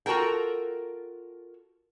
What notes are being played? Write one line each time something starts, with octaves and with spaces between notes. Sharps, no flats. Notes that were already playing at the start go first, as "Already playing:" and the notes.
F4 F#4 A4 A#4 G5